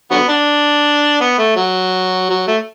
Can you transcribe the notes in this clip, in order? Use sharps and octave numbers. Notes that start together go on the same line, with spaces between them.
D3 F#3 B3
D4
B3
A3
F#3
F#3
A3